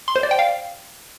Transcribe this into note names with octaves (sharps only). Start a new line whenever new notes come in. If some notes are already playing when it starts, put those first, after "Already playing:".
C6
C5
D5
G5
F5